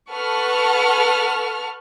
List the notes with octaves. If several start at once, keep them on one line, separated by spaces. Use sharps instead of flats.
A4 B4 F#5 A5 C#6 F6